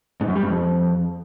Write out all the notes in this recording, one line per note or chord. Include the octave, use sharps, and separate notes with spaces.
G#2
F#2
G3
G2
F2